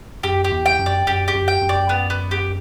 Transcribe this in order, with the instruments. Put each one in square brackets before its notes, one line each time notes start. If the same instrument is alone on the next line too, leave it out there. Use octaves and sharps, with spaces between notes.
[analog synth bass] F#2 [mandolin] G4
[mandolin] G4
[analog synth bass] E2
[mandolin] G5
[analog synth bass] F#2
[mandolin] D5
[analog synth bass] F#2 [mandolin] G4
[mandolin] G4
[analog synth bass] F#2
[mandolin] G5
[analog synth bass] F#2
[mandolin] D5
B3
B3
G4